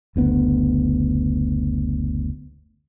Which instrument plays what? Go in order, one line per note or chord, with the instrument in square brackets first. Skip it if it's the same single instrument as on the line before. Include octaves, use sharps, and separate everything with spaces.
[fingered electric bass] F#1 D2 B3